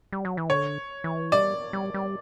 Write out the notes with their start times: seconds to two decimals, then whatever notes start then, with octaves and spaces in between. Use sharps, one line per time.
0.13 G3
0.25 F#3
0.37 E3
0.49 D3 C#5
1.04 E3
1.32 G3 D5
1.73 G3
1.94 G3